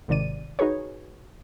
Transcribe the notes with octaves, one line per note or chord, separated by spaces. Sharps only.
G#1 C3 D#3 D5 D#7
D#4 F#4 G#4 B4 C#5